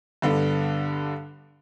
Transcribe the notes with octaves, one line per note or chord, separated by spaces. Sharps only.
G2 D3 B3 D4